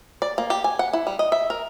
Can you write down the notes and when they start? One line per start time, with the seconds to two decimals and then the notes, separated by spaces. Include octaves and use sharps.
0.22 D5
0.38 A#3
0.50 G4
0.64 G#5
0.79 F#5
0.93 E4
1.07 G3
1.19 D#5
1.32 E5
1.50 A#4